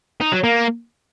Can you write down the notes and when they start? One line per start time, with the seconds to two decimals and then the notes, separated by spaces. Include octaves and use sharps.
0.21 D#4
0.32 F#3
0.44 A#3